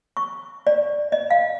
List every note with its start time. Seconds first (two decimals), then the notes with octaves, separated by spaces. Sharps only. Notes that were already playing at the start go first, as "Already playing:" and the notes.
0.17 C#6
0.67 D5
1.12 D#5
1.30 F5